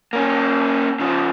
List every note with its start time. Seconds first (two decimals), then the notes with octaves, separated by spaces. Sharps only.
0.13 A#3 C#4
1.00 C#3 F3